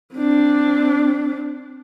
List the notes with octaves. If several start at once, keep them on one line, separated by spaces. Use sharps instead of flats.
C4 D4